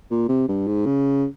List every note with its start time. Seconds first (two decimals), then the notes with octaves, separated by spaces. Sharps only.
0.11 A#2
0.29 C3
0.48 G2
0.67 G#2
0.86 C#3